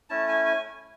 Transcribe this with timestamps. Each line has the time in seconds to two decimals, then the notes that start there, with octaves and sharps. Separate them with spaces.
0.10 A3 C#4 E4 A5
0.28 G#5
0.45 G#5